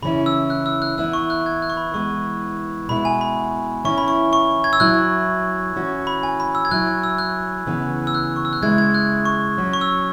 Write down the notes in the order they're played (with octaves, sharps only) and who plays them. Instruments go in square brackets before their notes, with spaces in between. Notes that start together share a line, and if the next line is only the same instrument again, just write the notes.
[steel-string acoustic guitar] C#3 E3 C#4 E4 [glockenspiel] B5
[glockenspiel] E6
F#6
E6
F#6
[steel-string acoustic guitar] E3 B3 E4 [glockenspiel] E6
[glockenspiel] C#6
F#6
G#6
F#6
C#6
B5
[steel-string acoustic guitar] E3 G#3 B3 [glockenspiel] C#6
[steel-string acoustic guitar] B2 G#3 E4 [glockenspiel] B5
[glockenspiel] G#5
B5
[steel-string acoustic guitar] E3 C#4 E4 [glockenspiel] C#6
[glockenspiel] B5
C#6
C#6
G#6
E6
[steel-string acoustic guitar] F#3 E4 [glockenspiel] F#6
[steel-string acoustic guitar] E3 C#4 F#4
[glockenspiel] B5
G#5
B5
E6
G#6
[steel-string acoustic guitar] F#3 E4 [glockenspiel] F#6
[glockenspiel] F#6
E6
F#6
[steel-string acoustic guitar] C#3 E3 B3
[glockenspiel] E6
F#6
C#6
E6
F#6
[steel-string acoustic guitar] C#3 G#3 E4 [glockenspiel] G#6
[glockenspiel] G#6
F#6
C#6
[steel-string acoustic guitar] F#3 C#4 F#4
[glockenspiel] C#6
E6